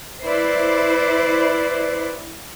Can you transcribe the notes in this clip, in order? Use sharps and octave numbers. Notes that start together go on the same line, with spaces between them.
E4 B4 C5 D5